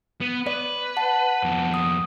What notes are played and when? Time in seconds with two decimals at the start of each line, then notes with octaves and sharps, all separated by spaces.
0.21 B3
0.47 B4 D5
0.97 F#5 A5
1.43 F2 B3
1.74 D#6